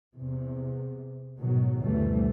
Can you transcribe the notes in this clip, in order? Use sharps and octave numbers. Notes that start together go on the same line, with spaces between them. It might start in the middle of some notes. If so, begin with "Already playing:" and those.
E2 C3
G#2 B2 D#3 F#3
F#1 D2 B2 E3 G3 A3